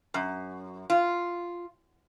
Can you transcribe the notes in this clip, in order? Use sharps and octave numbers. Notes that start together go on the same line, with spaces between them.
F#2
F4